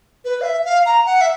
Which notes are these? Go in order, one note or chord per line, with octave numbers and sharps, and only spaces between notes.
B4
F5
E5
F5
A#5
F#5
E5